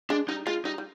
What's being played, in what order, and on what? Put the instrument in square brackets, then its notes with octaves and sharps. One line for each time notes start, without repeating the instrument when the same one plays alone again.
[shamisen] G#3 [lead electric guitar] D4
[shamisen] G3 [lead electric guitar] D#4
[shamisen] G#3 [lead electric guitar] F4
[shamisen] G3 [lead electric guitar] D#4
[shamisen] G3